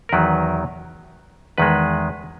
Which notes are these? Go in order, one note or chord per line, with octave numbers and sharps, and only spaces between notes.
A#4
E2 D#3 F#3 B4
E2 D#3 G#3 B4